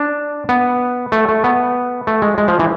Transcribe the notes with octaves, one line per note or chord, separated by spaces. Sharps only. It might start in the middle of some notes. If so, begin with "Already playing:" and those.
Already playing: D4
B3
A3
A3
B3
A3
G#3
G#3
F3
E3